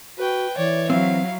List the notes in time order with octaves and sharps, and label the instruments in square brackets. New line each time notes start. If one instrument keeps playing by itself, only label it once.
[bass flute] F#4 [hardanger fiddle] B4 G5
[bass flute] E3 [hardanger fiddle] C#5 D5
[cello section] F#3 [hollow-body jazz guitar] C4 [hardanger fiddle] E4 F5